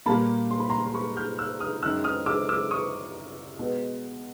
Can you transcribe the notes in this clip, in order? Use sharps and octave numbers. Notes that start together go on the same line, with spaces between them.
A#2 G3 A#3 A5 B5
C6
B5
A#5 C6
C6
B5 C#6
F6 G6
E6 F#6
D#6 F6
F#2 D#3 G#3 E6 F#6
D#6 F6
D6 E6
D6 E6
C#6 D#6
B2 G#3 B3